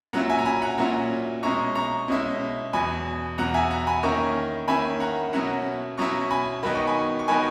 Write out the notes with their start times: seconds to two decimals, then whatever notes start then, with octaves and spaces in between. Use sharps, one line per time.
0.13 A#2 F#3 C#4 E4 F#5 A#5
0.30 E5 G#5
0.39 A#5
0.45 G#5 B5
0.62 F#5 A#5
0.78 A#2 F#3 C#4 E4 F#5 A#5
1.43 B2 G#3 C#4 E4 A#5 C#6
1.75 A#5 C#6
2.08 B2 G#3 C#4 E4
2.73 E2 B2 F#3 G#5 B5
3.38 E2 B2 F#3 F#5 A#5
3.54 E5 G#5
3.70 F#5 A#5
3.87 G#5 B5
4.03 D#3 A#3 C#4 E4 A#5 C#6
4.68 D#3 A#3 C#4 E4 G#5 B5
5.00 F#5 A#5
5.33 B2 F#3 C#4 E4 F#5 A#5
5.98 B2 F#3 C#4 E4 A#5 C#6
6.31 G#5 B5
6.63 D#3 F#3 B3 D#4 B5
6.75 C#6
6.87 G#5 B5
7.19 C#6
7.28 D#3 F#3 B3 D#4 G#5 B5